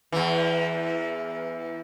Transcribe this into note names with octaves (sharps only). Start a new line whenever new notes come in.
E2 E3